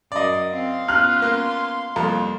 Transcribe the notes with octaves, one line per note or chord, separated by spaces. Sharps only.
F#2 A#4 D5 D#5
C4 F5 C6
B3 C#4 F4 F6 F#6
A#3
C2 F2 A#3